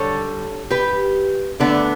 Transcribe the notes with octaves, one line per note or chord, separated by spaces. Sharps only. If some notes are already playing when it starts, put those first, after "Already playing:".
Already playing: D3 G3 A4 C#5
G4 B4
D3 A3 B3 D4